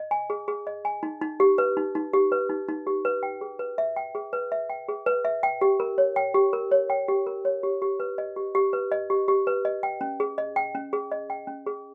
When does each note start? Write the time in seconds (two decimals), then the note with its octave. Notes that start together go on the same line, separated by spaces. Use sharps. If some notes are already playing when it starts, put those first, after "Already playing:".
Already playing: D#5
0.11 G#5
0.30 G#4
0.48 G#4
0.67 D#5
0.85 G#5
1.03 D#4
1.22 D#4
1.40 G4
1.58 B4
1.77 D#4
1.95 D#4
2.13 G4
2.32 B4
2.49 D#4
2.68 D#4
2.87 G4
3.05 B4
3.23 G5
3.41 G#4
3.59 B4
3.78 E5
3.96 G5
4.15 G#4
4.33 B4
4.52 E5
4.70 G5
4.88 G#4
5.06 B4
5.25 E5
5.43 G5
5.61 G4
5.80 A#4
5.98 C#5
6.16 G5
6.34 G4
6.53 A#4
6.71 C#5
6.90 G5
7.08 G4
7.27 A#4
7.45 C#5
7.63 G4
7.82 G4
8.00 B4
8.18 D#5
8.36 G4
8.55 G4
8.73 B4
8.92 D#5
9.10 G4
9.28 G4
9.47 B4
9.65 D#5
9.83 G5
10.01 C#4
10.20 G#4
10.38 D#5
10.56 G5
10.75 C#4
10.93 G#4
11.12 D#5
11.30 G5
11.47 C#4
11.66 G#4